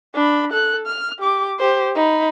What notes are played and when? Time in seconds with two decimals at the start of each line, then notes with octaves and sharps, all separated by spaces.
0.15 D4 B5
0.52 A4 F#6
0.87 F6
1.19 G4 D6
1.59 G4 C5
1.96 D#4 B5